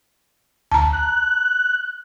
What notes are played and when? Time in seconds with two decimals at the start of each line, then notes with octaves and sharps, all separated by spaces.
0.71 D2 A5 A#5
0.93 F#6